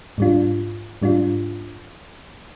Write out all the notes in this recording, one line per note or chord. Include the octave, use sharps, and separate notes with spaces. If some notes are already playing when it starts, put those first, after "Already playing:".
G#2 G3 D4 F4
G#2 G3 D4 F4